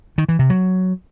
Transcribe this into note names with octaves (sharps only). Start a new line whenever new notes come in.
D#3
E3
C3
F#3